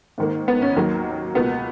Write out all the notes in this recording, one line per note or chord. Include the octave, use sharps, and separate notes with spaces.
G#2 D#3 A#3
B3
C#4
D#2 D#3 F#3 A#3
C#2 B2 A#3 B3